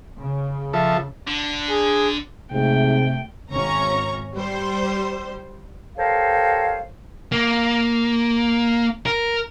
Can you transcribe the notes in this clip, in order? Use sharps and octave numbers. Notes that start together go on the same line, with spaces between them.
C#3
F3 A4 E5
D3
G#4
G#2 C3 A3 G5
G#1 C#4 A#5 C#6
G3 C5
G4 A4 A#4 C5 C#5 F5
A#3
A#4